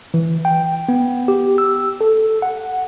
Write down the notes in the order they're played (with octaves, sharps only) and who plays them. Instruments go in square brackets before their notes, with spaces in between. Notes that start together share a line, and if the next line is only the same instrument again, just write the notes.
[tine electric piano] E3
G5
B3
G4
E6
A4
F#5